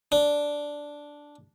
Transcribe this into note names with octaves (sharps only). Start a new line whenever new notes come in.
D4